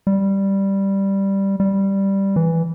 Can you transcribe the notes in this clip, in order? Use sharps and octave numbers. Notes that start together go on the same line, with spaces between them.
G3
G3
E3